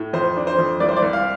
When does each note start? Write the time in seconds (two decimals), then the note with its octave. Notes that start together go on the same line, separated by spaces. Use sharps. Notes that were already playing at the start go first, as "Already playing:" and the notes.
Already playing: A2
0.13 F2 C5
0.37 D4
0.47 C5
0.58 F2
0.80 C2 D5
0.89 C5
0.96 D5
1.02 C2
1.13 F5